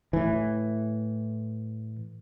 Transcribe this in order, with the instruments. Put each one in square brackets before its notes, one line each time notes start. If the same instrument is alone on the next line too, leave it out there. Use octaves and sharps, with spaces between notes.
[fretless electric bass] A2 E3